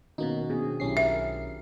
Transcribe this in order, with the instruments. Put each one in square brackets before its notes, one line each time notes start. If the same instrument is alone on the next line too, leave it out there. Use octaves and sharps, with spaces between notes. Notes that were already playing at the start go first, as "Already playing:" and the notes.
[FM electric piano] B2 A#3 D#4 [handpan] D#3 C#4 F#4
[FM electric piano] B2 [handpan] C4 D4 G#4
[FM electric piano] B1 C#4 C7 [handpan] E4 G4
[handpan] A#4 [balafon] E5